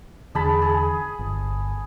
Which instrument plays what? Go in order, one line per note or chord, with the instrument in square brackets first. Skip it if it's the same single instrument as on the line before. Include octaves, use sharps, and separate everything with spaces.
[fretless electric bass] E2 D3 [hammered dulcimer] G#4 A5 B5
[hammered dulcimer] G#4
[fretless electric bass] G1